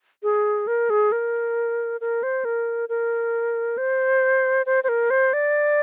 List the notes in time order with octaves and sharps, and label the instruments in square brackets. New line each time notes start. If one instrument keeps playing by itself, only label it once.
[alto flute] G#4
A#4
G#4
A#4
A#4
C5
A#4
A#4
C5
C5
C5
A#4
C5
D5